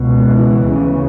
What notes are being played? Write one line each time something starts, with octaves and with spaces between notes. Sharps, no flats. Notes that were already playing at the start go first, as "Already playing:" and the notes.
Already playing: C#2 B2
E3
D2 C#3